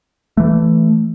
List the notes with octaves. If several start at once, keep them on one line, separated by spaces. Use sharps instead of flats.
E3 A3